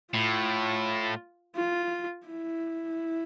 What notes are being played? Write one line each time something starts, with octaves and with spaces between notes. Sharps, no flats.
A2 F4
F4
E4